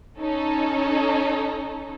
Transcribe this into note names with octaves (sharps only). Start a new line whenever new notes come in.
C#4 D#4 A4